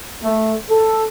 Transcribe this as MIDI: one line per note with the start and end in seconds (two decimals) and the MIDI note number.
0.23 0.53 57
0.70 1.05 69